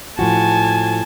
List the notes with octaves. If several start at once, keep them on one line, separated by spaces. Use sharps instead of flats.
A2 F3 F#4 G#5 A5